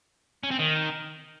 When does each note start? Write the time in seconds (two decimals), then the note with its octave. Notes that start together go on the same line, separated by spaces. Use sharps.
0.43 C#4
0.51 C4
0.59 D#3